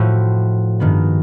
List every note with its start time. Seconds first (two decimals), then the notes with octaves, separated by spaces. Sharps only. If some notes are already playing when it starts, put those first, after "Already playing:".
Already playing: A2 F3 A3 F#4
0.80 G2 D#3 G#3 B3